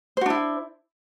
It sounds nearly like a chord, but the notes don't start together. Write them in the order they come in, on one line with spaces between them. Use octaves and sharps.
C5 F#4 D4 E4